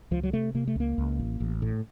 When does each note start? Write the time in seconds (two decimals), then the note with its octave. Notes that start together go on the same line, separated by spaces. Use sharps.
0.11 C#2 F3
0.23 F#3
0.33 C3 A3
0.54 C3 A#3
0.67 A3
0.76 C#2 A#3
0.98 C#2
1.19 A1
1.40 A1
1.62 A2